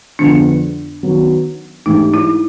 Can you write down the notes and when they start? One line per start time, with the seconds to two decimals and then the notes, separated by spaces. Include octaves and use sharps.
0.19 F2 D3 F3 G#3 B3 D4
1.03 D#3 F#3 B3
1.86 G#2 E3 A3 D4 D#4 G4
2.14 E4